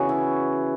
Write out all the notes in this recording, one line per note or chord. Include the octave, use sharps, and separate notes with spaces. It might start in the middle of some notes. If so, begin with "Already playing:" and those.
Already playing: C#3 E3 B3 F#4 G#4
E4